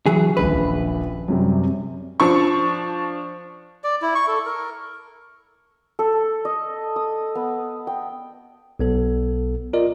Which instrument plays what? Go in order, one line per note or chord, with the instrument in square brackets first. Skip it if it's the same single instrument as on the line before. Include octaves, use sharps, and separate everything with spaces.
[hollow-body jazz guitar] E3 F#3 G#4
[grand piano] D#1 A#1 B5 [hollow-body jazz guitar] B4
[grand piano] F#2 C3 G3
[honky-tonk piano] F3 D4 C#6
[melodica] D5
E4
C#6
A4
A#4
[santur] A4
D#5
D#6
B3
G5
[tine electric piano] B1 B3 A4
F4 A#4 D5 D#5